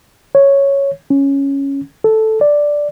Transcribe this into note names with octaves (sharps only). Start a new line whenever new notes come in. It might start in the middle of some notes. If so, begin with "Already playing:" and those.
C#5
C#4
A4
D5